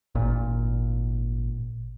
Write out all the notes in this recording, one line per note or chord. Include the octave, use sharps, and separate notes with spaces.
G#1 A#2